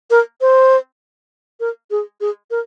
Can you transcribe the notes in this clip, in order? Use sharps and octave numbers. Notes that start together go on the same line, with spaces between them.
A#4
C5
A#4
G#4
G#4
A#4